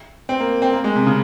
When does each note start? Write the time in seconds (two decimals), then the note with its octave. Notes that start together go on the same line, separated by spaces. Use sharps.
0.29 C4
0.40 A#3
0.62 C4
0.73 A#3
0.84 G#3
0.96 C3
1.06 C#3